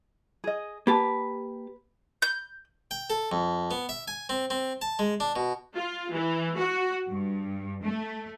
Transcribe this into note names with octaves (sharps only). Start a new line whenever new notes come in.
G#4 D#5
A#3 G4 B4 A5
G6
G5
A4
F2
B3
E5
G#5
C4
C4
A5
G#3
D4
B2
F4
E3
F#4
G2
A3